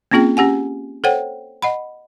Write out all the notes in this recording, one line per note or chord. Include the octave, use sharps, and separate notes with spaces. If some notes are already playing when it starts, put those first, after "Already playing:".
A#3 C4 C#4 F4 G#4 G5
C#4 G4 F#5 G#5
A4 C5 C#5 F#5 G5
D#5 F#5 B5